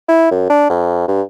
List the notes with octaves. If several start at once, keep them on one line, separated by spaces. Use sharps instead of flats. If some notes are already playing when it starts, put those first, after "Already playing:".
E4
F#2
D4
F2
G2